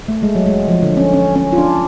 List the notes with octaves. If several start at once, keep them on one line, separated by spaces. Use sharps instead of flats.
A3
G#3
F#3
G#3
F3
D3
C#4
C#4
C#4
F4
D4